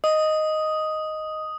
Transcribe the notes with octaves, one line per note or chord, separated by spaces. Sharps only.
D#5 D#6